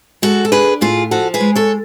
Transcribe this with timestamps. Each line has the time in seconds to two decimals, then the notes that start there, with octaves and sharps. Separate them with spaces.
0.22 G#3 F#4 A4
0.45 A4
0.52 D4 G#4 B4
0.81 A2 F4 G#4
1.11 F3 F#4 A4
1.34 G#4 B4
1.40 G#3
1.55 A4 C#5